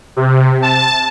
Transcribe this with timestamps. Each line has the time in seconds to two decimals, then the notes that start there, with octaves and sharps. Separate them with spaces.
0.17 C3
0.62 A5